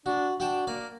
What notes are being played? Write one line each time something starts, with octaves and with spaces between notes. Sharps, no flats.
D4 F#4
D4 F#4 G5 A5
A#3 D5